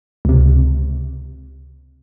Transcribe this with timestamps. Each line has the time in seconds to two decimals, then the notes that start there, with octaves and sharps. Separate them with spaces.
0.25 C#2 C3